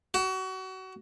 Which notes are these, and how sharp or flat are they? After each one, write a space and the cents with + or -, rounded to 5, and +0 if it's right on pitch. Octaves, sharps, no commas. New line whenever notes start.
F#4 +30